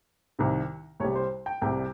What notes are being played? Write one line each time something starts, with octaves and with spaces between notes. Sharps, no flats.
C2 C3 D#3
C2 C3 G3 C#5
C5
G5
C2 C3 G3 G5